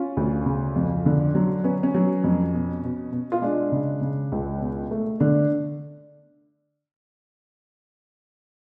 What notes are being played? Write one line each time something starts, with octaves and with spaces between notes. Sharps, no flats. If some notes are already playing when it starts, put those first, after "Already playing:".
Already playing: C#4 F4
D2
C#3
F2
D3
F#3
B3 C#4
C#4
F#3
F2
B2
B2
B2
F4
G#3 D4
C#3
C#3
C#2
B2
A3
D3 D4